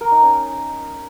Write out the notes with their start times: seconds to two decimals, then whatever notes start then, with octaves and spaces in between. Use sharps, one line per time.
0.01 A#4
0.12 D#4
0.22 C#4